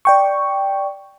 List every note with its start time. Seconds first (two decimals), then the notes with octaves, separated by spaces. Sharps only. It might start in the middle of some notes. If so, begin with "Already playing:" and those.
0.05 D5 G5 C#6